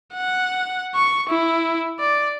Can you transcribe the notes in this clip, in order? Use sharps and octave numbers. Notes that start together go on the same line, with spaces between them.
F#5
C#6
E4
D5